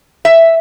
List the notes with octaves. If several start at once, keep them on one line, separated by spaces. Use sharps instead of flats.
E5